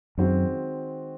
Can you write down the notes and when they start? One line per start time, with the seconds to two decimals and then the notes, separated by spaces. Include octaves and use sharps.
0.18 F#2 D#3 G#3 C4 F#4